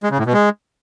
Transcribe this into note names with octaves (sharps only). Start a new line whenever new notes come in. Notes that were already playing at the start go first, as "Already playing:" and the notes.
G#3
C#3
A2
B2
G#3